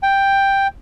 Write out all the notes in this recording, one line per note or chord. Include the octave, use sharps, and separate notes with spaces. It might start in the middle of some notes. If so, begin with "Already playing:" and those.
G5